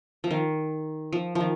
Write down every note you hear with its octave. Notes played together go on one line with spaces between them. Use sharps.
F3
D#3
F3
F3
D#3